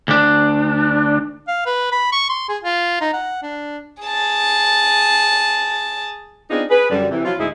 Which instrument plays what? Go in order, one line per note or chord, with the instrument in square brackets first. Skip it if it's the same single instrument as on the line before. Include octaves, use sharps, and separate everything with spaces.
[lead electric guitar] D2 D4
[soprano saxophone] F5
B4
B5
C#6
C6
G#4
F4
D#4
F#5
D4
[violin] G#4 A5
[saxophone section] B3 C4 D4 D#4 F4 G#4
G#4 B4
F#2 D3 G3
C3 E3
F3 F#3 E4 F4
D2 G#2 D#4 E4 G#4